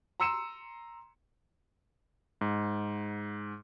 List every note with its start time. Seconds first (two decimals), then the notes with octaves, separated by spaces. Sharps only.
0.20 A#5 C6 E6 C#7 D#7 E7
2.41 G#2